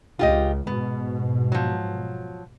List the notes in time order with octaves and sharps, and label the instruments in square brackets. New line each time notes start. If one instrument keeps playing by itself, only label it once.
[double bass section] C#2 [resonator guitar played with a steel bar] F4 G4 D#5
[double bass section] G#2 B2 [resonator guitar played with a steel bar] B3
[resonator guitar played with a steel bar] F3 F#3